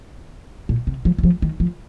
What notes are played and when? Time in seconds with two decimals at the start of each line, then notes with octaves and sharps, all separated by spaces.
0.69 A#2
0.87 C3
1.05 F3
1.18 G3
1.24 F3
1.42 D#3
1.60 F3